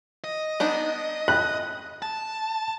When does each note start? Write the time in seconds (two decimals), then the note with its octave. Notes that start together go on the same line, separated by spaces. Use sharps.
0.24 D#5
0.60 B3 D4 D#4
1.28 B5 F#6
2.02 A5